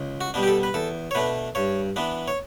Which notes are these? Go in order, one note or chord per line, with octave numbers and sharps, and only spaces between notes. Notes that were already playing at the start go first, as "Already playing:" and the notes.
Already playing: C#2
F#4
B2 G3 B3 D4
G4
A4
B4
E2 A4
C#5
B2 A3 D4 B4
G2 C#5
E3 B3 D4
C#5